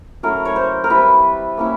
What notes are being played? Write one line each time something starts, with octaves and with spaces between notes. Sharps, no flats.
F#3 A3 C#4 E4 A#4
C#5
C5
A#4
G3 C4 E4 B4
A#3 C#4 E4